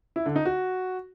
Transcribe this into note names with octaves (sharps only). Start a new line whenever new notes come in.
E4
D3
D#4
F#4